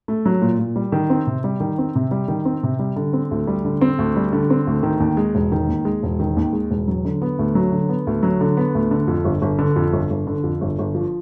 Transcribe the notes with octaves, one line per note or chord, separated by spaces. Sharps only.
A3
F#3
A#2
A#2
G3
D#3
C4
C3
G3
D#3
C4
C3
G3
D#3
C4
C3
G3
D3
C4
D2
G3
D3
C4
D2
G3
D3
C4
D2
D#3
D#2
G#3
E1
D#3
D#2
G#3
E1
D#3
D#2
G#3
E1
F#3
D3
B3
D2
F#3
D3
B3
D2
F#3
D3
B3
D2
D3
F2
G1
G1
D3
F2
G1
G1
D3
F2
G1
G1
F3